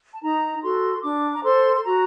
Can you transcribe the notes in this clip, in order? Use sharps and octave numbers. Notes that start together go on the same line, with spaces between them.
A5
D#4 A#5
F#4 A4 C6
D4 D6
A#5
A4 C5 C6
C6
F#4 A#5